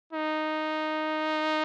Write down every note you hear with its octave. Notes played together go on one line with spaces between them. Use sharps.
D#4